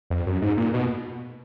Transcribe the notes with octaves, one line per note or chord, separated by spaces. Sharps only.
F2
F#2
G#2
A#2
B2